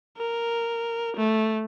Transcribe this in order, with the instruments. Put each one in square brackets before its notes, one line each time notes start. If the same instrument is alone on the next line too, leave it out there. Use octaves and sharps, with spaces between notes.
[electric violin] A#4
A3